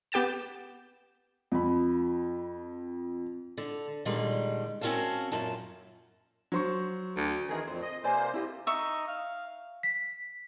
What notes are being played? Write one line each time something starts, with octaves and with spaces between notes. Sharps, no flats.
B3 G4 G5 A6 E7
F2 B5
D3
A#2 D3 D#3 G3 G#3
C4 C#4 F#4 A#4 F5 A5
F#2 A#2 A5
F#3 C5 C#6
D2
D#3 E3 G#4 A#4 D#5
F2 A#2 C5
D#5
C3 A#3 B4 C5 D5 G#5
E4 G4 D#5
D#4 E5 C#6
F5
B6